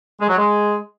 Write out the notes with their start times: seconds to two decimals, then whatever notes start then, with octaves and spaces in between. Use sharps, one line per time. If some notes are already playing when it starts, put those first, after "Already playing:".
0.20 G#3
0.28 F#3
0.37 G#3